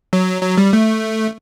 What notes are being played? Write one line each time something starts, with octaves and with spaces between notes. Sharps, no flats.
F#3
F#3
G3
A3